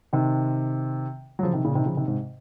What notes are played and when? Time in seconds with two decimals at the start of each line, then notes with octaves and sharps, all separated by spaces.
0.13 C3 D#3
1.39 F#3
1.43 C#3 F3
1.53 C3 D#3
1.65 A#2 C#3
1.75 C3 D#3
1.86 C#3 F3
1.97 C3 D#3
2.08 G#2 C3